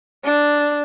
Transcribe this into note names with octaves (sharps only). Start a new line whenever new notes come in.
D4